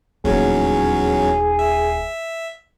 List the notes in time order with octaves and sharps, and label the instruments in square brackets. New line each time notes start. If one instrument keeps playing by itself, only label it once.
[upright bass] D#1 D#4 [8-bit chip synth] E2 F#3 C#4 [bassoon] G#4
[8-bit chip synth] E5